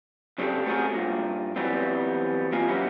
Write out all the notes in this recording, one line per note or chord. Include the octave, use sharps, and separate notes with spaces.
C#3 F#3 C4 D4 G4 A4
A3 B3 C4 F#4 G#4 A#4
G2 A#2
E3 F#3 G3 B3 C4
A#3 C4 F4 D#5 G#5
F#3 A#3 B3 C#4 E4 G4